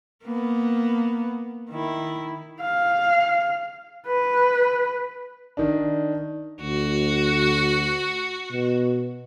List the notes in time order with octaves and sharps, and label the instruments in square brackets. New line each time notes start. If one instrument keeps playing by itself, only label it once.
[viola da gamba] A#3 B3
D#3 E4
[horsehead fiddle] F5
B4
[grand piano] D#3 D4
[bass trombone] D2 [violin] F#4
[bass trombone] B2